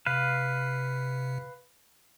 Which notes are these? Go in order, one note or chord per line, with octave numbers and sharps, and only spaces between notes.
C3 B4 F5